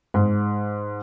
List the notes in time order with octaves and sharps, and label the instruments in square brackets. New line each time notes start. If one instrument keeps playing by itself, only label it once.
[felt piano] G#2